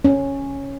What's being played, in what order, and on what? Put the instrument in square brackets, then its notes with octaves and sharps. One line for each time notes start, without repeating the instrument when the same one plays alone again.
[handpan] C#4